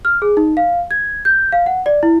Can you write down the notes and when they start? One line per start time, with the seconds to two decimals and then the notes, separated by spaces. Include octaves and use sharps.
0.05 F6
0.22 G#4
0.37 D#4
0.57 F5
0.91 G#6
1.25 G6
1.52 F5
1.66 F#5
1.86 D5
2.03 E4